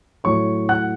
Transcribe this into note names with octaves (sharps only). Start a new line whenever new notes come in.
A2 F#3 A3 C#5 C#6
F#5 F#6